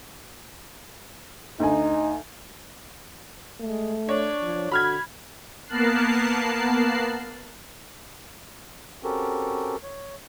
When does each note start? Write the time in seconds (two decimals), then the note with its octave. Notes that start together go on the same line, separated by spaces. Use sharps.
1.60 D2 D#4 G#5
3.60 G#3 A3
4.09 D4 C#5
4.43 F3
4.72 D3 F#4 B5 F6 G#6
5.67 A#3 B3 A#4 A5 F#6 C7
9.04 C4 C#4 F#4 G4 A4 A#4
9.83 C#5